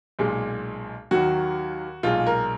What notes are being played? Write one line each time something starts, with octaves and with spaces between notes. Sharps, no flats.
B1 A#2 G#3
D#2 D#3 F#3 F#4
B1 A#2 G#3 F4
A#4